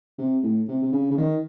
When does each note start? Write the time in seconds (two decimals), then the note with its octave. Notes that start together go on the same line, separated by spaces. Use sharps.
0.18 C3
0.43 A2
0.68 C3
0.82 C3
0.92 C#3
1.11 C#3
1.18 D#3